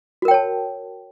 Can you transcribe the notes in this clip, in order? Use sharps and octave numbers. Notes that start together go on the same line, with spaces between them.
F#4 A#4 C#5 G5 A5